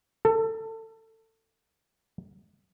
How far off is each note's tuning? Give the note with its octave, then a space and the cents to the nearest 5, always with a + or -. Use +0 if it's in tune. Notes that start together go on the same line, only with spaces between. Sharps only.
A4 +25